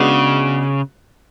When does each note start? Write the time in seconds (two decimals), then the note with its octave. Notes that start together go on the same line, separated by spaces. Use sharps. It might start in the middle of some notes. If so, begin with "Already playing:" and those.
Already playing: C#3 G#3 B3 D4 F#4 B4